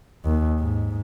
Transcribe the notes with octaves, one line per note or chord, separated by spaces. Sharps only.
D#2
G#2